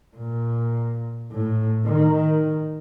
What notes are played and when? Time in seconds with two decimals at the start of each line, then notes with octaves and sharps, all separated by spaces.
0.17 A#2
1.32 A2
1.86 D#3